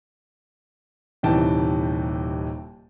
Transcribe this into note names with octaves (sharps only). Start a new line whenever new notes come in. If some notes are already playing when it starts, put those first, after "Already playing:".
D#1 C3 D#3 E3 G5 A5